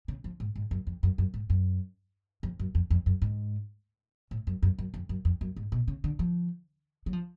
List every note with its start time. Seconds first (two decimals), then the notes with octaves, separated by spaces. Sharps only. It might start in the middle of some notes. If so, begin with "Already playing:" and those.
0.08 C#3
0.24 F3
0.40 G#2
0.56 G#2
0.71 F#2
0.87 F2
1.03 F#2
1.18 F#2
1.34 G#2
1.50 F#2
2.43 F2
2.60 F#2
2.75 F2
2.90 F2
3.06 F#2
3.22 G#2
4.31 A2
4.47 F#2
4.63 F#2
4.78 F#2
4.94 F2
5.09 F#2
5.25 F2
5.41 F#2
5.56 G#2
5.72 B2
5.88 C#3
6.04 D3
6.19 F3
7.06 F#3
7.13 F3